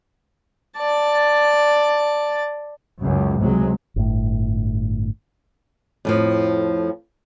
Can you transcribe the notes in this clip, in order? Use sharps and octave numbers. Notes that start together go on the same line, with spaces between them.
D5 A5
C#2 F#2
C#2 C3 F#3 G#3
G1 A2
F2 A2 F3